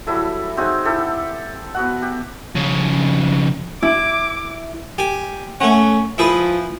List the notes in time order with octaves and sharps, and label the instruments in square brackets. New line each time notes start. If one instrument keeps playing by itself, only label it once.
[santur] F#3 G3 E4 A4
C4 D#4 F#4 G#4
E4 G4 A4
B3 F#4 F#5
G4
[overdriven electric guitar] F2 C#3
[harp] E4 [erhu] D6
[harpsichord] G4 G#5
[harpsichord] A3 F#5 [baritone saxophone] C#4
[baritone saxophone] F3 [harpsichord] E4 G#4 B4